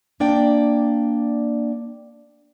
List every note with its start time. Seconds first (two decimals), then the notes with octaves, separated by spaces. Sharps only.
0.20 A#3 D4 D5 G5